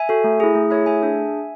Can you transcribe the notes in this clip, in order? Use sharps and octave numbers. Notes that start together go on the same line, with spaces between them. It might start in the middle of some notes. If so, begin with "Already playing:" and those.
Already playing: E5 G#5
F#4 A4
A3
E4 G#4
A3
E4 G#4 C#5 E5
A3 E5 G#5
D4 G#4